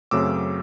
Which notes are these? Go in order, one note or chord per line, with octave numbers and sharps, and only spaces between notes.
F#2 C#3 F#3 A3 C4 D6 E6